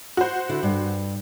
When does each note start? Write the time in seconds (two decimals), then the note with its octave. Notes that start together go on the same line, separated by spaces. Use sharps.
0.17 F#4 C5
0.49 D3 E4
0.63 G2